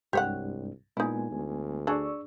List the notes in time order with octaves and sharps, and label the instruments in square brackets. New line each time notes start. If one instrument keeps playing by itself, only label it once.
[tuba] C2 [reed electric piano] G2 G#3 D4 [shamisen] G4 C#5 F#5
[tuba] A#2 [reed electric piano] G#3 B3 G#5 [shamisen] D#4 E4
[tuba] D2
[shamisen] D4 G#4 [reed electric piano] D5 C#6 E6